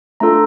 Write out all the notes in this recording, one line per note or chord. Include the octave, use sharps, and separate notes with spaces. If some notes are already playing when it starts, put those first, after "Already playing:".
A3 D4 F4 A4 A#5